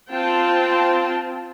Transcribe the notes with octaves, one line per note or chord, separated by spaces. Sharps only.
C4 F4 G5 A5